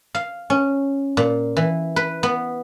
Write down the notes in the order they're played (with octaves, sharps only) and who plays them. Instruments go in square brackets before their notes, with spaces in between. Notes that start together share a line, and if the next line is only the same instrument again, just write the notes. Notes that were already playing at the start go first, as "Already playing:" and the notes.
[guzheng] F5
C#4
A#2
E3
B4
B3